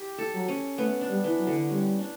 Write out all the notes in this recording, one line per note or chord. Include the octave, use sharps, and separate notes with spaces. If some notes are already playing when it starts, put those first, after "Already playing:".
Already playing: G4
A4
F#3
C#4
A3 B3
D4
G3
E3
F#3
D3
G3 C#4
D4